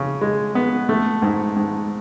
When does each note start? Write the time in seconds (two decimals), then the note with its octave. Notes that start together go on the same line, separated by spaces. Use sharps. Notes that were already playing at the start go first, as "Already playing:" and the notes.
Already playing: C#3
0.21 G#3
0.55 B3
0.89 A3
1.22 G#2
1.56 G#2